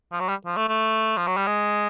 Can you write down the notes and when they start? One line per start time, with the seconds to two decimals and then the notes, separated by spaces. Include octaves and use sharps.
0.12 F3
0.20 F#3
0.29 G3
0.46 F3
0.57 A3
0.69 A3
1.17 F3
1.27 F#3
1.37 G3
1.47 G#3